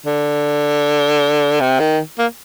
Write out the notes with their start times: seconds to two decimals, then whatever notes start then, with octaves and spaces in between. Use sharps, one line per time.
0.06 D3
1.60 C3
1.80 D#3
2.19 A#3